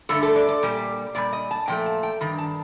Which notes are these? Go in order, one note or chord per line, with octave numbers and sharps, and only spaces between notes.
G2 D3 A3 A4
A4
D5
D5
A#2 G3
A#2 G3 D5
D#5
A5
A#2 F3 A3 G5
A5
G5
G2 D#3
A5